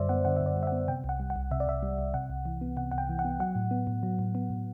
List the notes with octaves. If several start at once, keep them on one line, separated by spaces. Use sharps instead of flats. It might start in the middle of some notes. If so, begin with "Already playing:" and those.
Already playing: F#2 D3 G3 C5 D5 E5
B3 F#5
D3 F#5
F#2 E5
D5
G3
E5
F#5
B3
C3 G5
C2 F#5
G3
F#5
C2
C3 E5
D5
C2 E5
G3
C2
C3 F#5
C2
E3
B3
C3 F#5
C2 F#5
G5
E3
F#5
B3
F#3 F#5
A2
B3
A2
F#3
A2
B3
A2